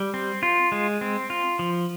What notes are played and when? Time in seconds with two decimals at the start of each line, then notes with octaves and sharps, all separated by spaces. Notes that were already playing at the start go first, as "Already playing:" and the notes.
Already playing: G3
0.14 C4
0.43 F4
0.72 G#3
1.01 C4
1.30 F4
1.59 F3